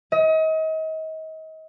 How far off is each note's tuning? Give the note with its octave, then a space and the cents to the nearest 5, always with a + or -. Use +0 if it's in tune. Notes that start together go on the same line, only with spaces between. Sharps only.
D#5 +35